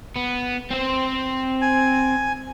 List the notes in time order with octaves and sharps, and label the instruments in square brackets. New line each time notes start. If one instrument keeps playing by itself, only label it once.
[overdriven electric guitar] B3
C4 C5
[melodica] G#5